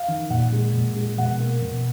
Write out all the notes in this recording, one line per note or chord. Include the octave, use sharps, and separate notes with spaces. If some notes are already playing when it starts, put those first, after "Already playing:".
Already playing: F5
D#3
A#2 F#5
G#3
A#2
G#3
B2 F#5
A#3
B2